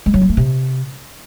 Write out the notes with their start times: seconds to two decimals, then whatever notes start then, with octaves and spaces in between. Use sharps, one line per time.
0.06 G#3
0.14 F#3
0.22 B3
0.29 A3
0.37 C3